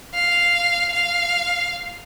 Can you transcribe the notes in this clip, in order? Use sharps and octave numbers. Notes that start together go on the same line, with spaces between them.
F5
F5